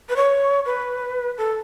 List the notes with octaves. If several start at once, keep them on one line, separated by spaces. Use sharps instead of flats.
B4
C#5
B4
A4